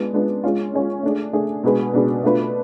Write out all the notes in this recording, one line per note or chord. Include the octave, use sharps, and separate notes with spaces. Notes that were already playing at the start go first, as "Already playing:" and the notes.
Already playing: G#3 B3 D4 F4
G#3 B3 D4 F4
G#3 C#4 F4
G#3 C#4 F4
A3 D4 G#4
A3 D4 G#4
B2 G#3 D4 G#4 B4
B2 G#3 D4 G#4 B4
B2 A3 D4 F4 B4